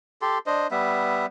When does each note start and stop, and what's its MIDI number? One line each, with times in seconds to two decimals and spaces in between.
0.22 0.38 67
0.22 0.38 69
0.22 0.38 84
0.46 0.67 62
0.46 0.67 72
0.46 0.67 75
0.71 1.26 55
0.71 1.26 59
0.71 1.26 76